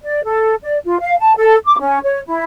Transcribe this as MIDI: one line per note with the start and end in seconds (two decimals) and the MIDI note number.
0.02 0.23 74
0.24 0.55 69
0.63 0.78 74
0.85 0.98 65
0.99 1.15 77
1.20 1.35 81
1.36 1.55 69
1.66 1.76 86
1.79 1.99 61
2.03 2.20 73
2.26 2.44 64